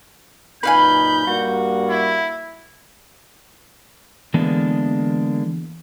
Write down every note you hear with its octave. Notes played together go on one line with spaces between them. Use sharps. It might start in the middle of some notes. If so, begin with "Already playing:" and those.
F#2 A#2 D#4 B4 F5 G#5 B5 G6
G2 G3 A#3 F#4
E4
D3 E3 G#3 A#3 B3 D4